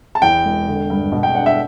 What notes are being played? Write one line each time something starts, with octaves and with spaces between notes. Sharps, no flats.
A5
E2 G5
E1
D3
G2
B2
G5
D4 F#5
E5